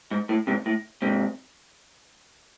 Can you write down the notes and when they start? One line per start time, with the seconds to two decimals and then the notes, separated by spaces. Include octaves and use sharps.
0.11 G#2
0.29 A2
0.47 G#2 C3
0.66 A2
1.02 G#2 C3